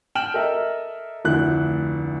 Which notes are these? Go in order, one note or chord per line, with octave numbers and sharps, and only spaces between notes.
G5 F6 E7 F#7
A4 A#4 D#5 E5
F1 D2 E4 F#6